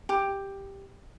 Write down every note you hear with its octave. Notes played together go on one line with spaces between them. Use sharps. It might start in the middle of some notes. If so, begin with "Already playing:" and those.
G4